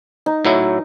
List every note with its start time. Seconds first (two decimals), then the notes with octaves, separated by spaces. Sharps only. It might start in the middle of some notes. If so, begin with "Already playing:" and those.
0.26 D#4
0.45 A2 F#3 E4